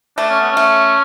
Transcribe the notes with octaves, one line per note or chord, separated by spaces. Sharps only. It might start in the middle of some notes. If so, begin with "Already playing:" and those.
A3 D4
C#4
B3
C#4
A3